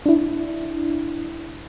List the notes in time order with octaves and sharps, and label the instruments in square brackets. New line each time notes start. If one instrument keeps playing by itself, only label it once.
[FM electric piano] D4 E4